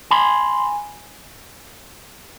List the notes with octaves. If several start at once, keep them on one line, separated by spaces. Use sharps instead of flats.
G#5 B5 C6